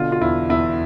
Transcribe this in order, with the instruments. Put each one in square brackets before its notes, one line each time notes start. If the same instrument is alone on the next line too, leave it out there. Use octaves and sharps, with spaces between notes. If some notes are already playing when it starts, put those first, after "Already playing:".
Already playing: [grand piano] B2 D3 F4
F4
E2 E4
E2 E4